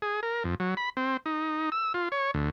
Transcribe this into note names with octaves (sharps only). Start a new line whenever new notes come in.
G#4
A#4
F2
F#3
B5
C4
D#4
E6
F4
C#5
D2